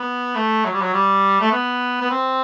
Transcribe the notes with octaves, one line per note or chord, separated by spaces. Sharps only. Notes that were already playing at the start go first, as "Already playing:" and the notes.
Already playing: B3
A3
F#3
G3
F#3
G3
A3
B3
B3
C4